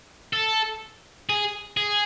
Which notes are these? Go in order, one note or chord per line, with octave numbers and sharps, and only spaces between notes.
A4
G#4
G#4